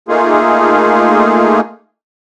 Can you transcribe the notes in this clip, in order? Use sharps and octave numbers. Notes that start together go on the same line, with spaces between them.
A3 A#3 D#4 F4 G#4